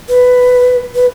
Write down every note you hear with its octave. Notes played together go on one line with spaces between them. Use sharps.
B4
B4